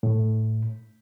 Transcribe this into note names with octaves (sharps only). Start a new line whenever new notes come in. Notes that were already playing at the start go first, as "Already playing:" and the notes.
A2